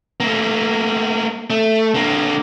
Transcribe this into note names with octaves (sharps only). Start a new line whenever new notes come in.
A3 A#3
A3
D3 A#3